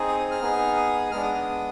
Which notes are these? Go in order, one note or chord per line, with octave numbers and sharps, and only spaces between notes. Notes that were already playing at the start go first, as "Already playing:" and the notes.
Already playing: C4 D#4 G#4
D#6
D#6
F6
B3 D#4 G#4
D#6
G#3 B3 D4 F6
D#6
D#6